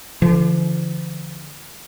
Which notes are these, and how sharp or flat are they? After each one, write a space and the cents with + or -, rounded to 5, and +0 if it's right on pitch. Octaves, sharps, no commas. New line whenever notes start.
D3 -5 F3 -40